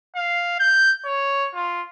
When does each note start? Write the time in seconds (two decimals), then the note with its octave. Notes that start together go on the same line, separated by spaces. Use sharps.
0.16 F5
0.59 G6
1.05 C#5
1.54 F4